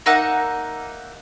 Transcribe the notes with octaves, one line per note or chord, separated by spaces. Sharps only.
A#3 D#4 E5 F#5